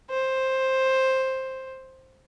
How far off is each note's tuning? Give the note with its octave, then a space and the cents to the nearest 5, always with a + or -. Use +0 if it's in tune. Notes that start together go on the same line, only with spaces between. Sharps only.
C5 +10